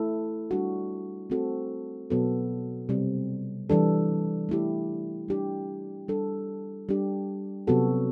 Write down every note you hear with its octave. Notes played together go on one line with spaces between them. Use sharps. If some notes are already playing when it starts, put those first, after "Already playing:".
Already playing: A3 E4 A4
G3 D4 F#4
A3 C4 F#4 A4
B2 F#3 B3 F#4 A4
C3 G3 C4
E3 G3 D4 A4
A3 E4 G4
G3 D4 G4
G3 D4 A4
G3 D4 G4
C3 F#3 B3 F#4 A4